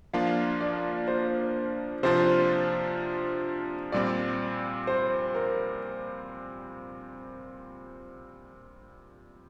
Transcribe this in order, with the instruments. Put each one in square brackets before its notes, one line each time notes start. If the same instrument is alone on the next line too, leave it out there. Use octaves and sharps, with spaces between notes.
[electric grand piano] F3 A#3 D4 F4 [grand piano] F5
[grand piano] D5
C5
[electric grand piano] C3 F3 D4 F4 [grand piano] C5
[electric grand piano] A#2 G3 C4 [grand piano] D5
[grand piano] C5
A#4